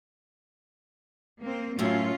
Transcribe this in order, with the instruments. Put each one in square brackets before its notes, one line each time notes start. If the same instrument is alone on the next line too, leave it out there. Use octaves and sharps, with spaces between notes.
[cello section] A#3 C4
[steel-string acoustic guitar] F#2 A2 F#3 [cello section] C#4 F4